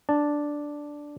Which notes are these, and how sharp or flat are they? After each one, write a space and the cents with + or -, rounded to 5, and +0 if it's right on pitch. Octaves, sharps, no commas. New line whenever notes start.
D4 +0 A5 +0